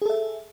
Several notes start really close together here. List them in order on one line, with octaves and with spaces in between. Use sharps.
G#4 A4 E5